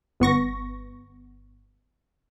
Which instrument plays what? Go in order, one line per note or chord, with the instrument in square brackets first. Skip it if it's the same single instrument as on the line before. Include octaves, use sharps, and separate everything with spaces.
[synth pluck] G1 B3 C#6 A#6